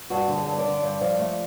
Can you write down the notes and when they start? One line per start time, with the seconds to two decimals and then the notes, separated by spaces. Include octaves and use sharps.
0.10 G2 F#4
0.28 D3
0.34 G#4
0.46 G2
0.58 D5
0.65 D3
0.82 G2
1.01 F3
1.19 A3